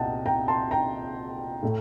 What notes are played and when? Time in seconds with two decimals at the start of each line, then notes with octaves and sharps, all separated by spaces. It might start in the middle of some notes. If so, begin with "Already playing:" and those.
Already playing: C2 A#2 D#5 F#5 G5 A5
0.26 G5 A#5
0.48 A5 C6
0.71 G5 A#5
1.62 A2 A3